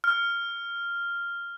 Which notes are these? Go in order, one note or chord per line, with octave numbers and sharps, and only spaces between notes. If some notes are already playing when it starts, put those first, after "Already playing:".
F6